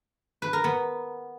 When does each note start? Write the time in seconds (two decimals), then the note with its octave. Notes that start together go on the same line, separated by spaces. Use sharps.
0.42 B4
0.53 A#4
0.64 B3